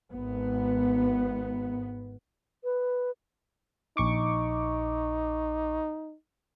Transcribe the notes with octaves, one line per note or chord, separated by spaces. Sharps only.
G#1 B3
B4
A#1 D#4 C#6 D6